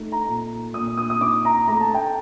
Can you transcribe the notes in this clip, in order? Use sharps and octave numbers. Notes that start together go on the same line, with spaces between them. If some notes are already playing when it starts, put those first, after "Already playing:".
Already playing: A3 D#4
A#5
A#2
A#2 D#6
D#6
D#6
D#4 D6
A#5
A3 A#5
A5
G5